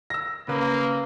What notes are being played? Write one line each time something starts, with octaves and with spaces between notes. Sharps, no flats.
E6 A#6
C#3 A#3 B4